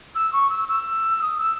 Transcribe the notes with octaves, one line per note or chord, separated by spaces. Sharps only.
E6
C#6
E6
E6
D#6
E6